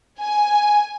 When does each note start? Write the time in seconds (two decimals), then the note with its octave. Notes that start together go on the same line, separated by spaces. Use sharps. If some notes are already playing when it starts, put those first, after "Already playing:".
0.21 G#5